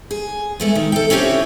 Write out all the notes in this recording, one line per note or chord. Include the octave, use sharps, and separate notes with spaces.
G#4
G#3 A3 B3
D#3
A4 G5
C4 C#4 E4 F4 G4 C#5